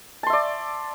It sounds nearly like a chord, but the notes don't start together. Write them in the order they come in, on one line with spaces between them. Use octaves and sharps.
A5 C6 E5 D5